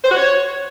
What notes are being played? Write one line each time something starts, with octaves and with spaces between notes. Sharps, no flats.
C5
F#4
C#5